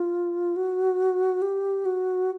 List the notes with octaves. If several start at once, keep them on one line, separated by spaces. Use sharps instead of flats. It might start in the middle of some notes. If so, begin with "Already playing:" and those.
Already playing: F4
F#4
G4
F#4